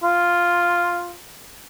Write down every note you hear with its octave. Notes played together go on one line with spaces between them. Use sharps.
F4